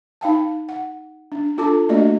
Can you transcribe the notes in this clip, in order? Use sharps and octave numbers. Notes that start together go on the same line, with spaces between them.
D#4 F5 G5 A5
F#5
D4
D4 F4 A4 A5 D6
A3 A#3 D4 F#4 D5 D#5